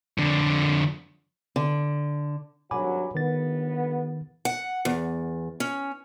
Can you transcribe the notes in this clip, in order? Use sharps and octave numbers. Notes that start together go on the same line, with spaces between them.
F2 D3
D3
G#1 G2 F#3 G#5 B5 D6
G1 D#3 B3 A6
F#5
E2
C#4